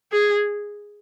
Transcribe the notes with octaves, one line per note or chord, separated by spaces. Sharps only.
G#4